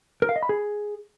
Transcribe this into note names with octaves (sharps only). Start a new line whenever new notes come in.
A#4
F5
D#5
B5
G#4